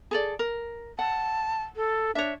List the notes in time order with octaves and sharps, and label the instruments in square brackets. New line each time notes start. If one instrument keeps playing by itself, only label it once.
[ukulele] G#4 A4 D5
A#4
[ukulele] F#5 [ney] A5
[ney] A4
[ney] D4 [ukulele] C#5 E5